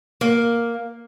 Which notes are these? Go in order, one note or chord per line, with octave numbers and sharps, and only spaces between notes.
A#3